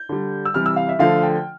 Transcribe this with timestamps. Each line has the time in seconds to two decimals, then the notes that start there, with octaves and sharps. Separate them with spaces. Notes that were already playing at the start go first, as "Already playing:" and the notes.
Already playing: G6
0.09 D3 G3
0.45 E6
0.54 C3 E3 G3 F6
0.66 E6
0.76 F5
0.89 E5
0.99 D3 F3 A3 F5
1.23 G5